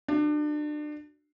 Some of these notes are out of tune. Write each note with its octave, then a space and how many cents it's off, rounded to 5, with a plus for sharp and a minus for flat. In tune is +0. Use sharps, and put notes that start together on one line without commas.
D4 +30 F#4 +0